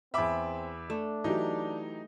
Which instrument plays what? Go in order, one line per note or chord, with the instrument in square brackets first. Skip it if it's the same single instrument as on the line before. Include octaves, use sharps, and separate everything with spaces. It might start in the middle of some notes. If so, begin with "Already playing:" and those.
[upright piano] E2 E6 [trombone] C4 [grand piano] E5 B5 D6
[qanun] A3 [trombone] D4
[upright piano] E3 F#3 G4 [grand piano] D#4